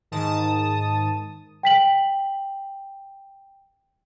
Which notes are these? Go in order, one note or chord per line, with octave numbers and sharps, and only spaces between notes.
G#2 D#3 A5 D#6
G5 B6 F#7